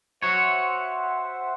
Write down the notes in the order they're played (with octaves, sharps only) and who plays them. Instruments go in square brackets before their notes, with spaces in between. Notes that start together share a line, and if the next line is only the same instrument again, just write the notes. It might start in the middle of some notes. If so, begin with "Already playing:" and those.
[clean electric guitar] F#4 C#5 [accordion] C5 E5 F#5